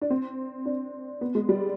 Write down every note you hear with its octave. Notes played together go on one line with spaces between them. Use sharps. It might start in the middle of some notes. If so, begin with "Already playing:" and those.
D4
C4
D4
B3
G#3
G3